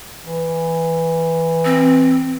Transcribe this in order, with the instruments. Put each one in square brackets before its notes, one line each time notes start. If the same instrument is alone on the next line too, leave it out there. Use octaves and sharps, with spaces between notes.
[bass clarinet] E3
[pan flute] C4